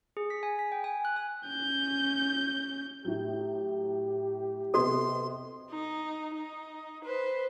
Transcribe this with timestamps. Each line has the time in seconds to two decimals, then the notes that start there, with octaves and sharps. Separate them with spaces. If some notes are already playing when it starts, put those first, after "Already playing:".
0.17 G#4
0.30 B6
0.43 G#5
0.59 B6
0.72 G5
0.84 G#5
1.05 F#6
1.16 G#5
1.48 C#4 G6
3.05 A2 F#3 G4
4.74 C3 B3 F#4 A4 D#5 C6
5.70 D#4
6.34 D#4
7.04 B4 C5